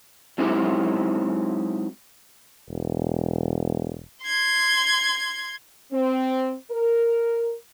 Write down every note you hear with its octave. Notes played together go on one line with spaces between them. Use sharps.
F#3 G#3 C4 D#4 E4 G4
E1
C6 G#6
C4
A#4